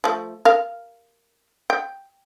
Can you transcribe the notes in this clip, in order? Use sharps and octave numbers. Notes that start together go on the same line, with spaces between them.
F3 A3
A#4 F5
G5